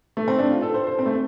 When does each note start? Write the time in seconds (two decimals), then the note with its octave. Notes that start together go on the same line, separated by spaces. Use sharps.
0.17 A3
0.28 C4
0.39 D4
0.50 F4
0.62 A4
0.74 C5
0.87 C5
0.99 C4
1.06 A3